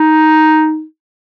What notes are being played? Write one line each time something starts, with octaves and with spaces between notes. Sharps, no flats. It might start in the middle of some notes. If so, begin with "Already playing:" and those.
Already playing: D#4